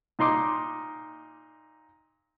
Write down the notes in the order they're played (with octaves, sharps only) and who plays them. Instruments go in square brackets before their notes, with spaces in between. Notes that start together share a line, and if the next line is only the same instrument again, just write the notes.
[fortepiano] A#2 D#4 C6 D6